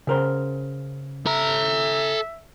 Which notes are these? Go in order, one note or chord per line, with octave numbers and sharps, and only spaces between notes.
C#3 A#4 C5
A4 E5 A#5